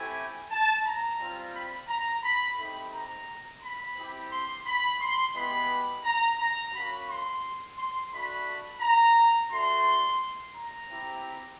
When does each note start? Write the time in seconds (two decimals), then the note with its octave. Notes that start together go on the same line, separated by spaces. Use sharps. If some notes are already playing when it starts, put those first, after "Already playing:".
Already playing: A3 C4 E4 G4 G#5
0.50 A5
0.84 A#5
1.19 G3 C4 F4
1.54 B5
1.88 A#5
2.23 B5
2.57 A3 C4 D#4 G4 B5
2.92 A#5
3.62 B5
3.96 C4 E4 G4
4.31 C6
4.65 B5
5.00 C6
5.34 G#3 B3 E4 G4 B5
6.04 A#5
6.39 A#5
6.73 A#3 C#4 F#4 B5
7.07 C6
7.77 C6
8.12 A3 D4 F#4 B5
8.81 A#5
9.50 A3 D4 F#4 C6
10.54 A#5
10.89 C4 E4 G4